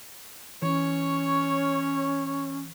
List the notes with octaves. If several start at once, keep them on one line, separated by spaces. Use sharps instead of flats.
E3 C#4 C#5